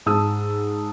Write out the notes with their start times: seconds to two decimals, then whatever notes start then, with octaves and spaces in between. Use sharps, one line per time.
0.06 G#2 A5 D#6 E6